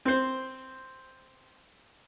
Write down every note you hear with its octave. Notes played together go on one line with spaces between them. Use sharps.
C4 C5